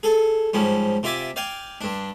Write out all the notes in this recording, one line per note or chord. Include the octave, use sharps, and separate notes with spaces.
G#4 A4
G#2 F3 G3 C#4
C3 F4 D5 E5 G#5 D6
D5 F5 G5 G#5
G2 D4